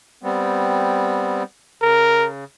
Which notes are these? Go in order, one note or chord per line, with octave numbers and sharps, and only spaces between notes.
G3 B3 C4
C#3 A#4